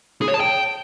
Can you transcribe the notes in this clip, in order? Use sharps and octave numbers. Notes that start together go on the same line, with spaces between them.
G#4
C#5
A5
G5